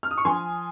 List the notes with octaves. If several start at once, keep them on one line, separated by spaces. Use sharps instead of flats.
F6
D#6
C#6
F3 G#5 C6